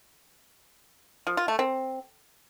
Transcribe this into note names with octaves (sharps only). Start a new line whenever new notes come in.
F3
F4
A3
C4